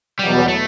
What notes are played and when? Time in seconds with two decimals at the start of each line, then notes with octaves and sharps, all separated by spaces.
0.19 E2 B2 F#3 G3 B3
0.48 A3